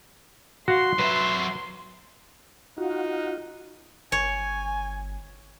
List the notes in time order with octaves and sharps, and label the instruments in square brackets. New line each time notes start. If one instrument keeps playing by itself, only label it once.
[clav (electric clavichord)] F#4 F5 [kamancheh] C6
[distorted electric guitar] F#3 E5 [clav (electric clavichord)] B4
[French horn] D#4 [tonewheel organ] F4 F#4
[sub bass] G1 [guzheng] C#5 [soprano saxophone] G#5